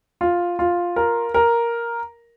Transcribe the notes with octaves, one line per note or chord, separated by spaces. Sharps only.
F4
F4
A#4
A#4